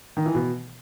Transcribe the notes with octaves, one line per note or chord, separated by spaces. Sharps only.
D#3
E3
B2